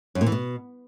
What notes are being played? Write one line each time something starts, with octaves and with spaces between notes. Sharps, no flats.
F#2
A#2
E3
B2